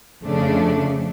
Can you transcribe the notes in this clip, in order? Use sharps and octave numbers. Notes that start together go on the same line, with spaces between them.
F2 C#3 F3 A3 D4